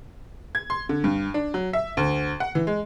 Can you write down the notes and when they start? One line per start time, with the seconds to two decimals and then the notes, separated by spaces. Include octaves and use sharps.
0.55 G#6
0.70 C6
0.89 D3
1.04 G2
1.34 D4
1.54 F#3
1.73 E5
1.97 D2
2.40 F#5
2.55 E3
2.67 G#3